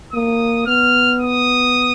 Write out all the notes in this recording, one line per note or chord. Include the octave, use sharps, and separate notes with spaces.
A#3 D#6
B3 F6
D#6